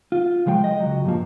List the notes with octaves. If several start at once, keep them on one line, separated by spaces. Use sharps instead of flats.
F4
C2 F3 G#3 C5 G5
D#5
C#2 F#3
G2 A#2 F3